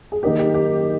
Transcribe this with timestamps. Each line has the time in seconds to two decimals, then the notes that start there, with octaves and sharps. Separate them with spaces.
0.12 G#4
0.23 D#3 A#3 D#4 G4 A#4 D#5
0.39 G4
0.54 G4